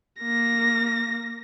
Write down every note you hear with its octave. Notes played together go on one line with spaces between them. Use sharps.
A#3 A#6